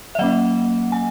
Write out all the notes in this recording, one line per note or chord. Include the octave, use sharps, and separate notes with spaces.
E5
F#3 A#3 C#4 D#5 F#5
G#5